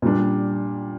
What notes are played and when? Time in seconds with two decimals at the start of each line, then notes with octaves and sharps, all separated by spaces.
0.02 A#2 G3 D4